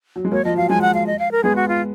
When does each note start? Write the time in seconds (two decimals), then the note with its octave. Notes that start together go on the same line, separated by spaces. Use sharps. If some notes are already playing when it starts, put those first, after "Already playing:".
0.16 F#3
0.25 G#3
0.32 F#3 A#3 C#5
0.45 F3 D#5
0.57 F#3 F5
0.69 F3 G#3 G#5
0.82 F#5
0.94 F5
1.07 D#5
1.19 F5
1.32 A#4
1.43 G#3 B3 G#4
1.56 F#4
1.68 F4